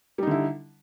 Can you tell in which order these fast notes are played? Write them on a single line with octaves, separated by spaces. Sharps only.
G3 D#4 D3 E4